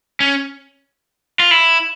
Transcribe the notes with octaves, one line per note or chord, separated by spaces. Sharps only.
C#4
F4
E4